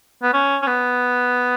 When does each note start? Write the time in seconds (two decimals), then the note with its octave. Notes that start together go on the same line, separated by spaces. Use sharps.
0.23 B3
0.33 C#4
0.62 C#4
0.67 B3